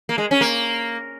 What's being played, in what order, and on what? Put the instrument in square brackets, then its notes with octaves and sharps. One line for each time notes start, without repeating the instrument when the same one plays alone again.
[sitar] A#3
G#3
C#4
A#3